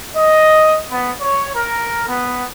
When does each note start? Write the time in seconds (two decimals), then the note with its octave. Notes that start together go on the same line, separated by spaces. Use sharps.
0.16 D#5
0.92 B3
1.21 C#5
1.54 A#4
2.08 B3